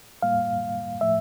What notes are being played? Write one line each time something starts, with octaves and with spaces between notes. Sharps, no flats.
A2 G3 A#3 F5
A2 F3 A3 E5